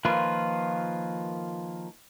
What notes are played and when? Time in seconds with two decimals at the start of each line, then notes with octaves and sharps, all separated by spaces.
0.05 D#3 F3 A#3 F4 B4